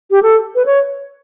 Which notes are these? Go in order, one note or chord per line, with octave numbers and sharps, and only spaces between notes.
G4
A4
B4
C#5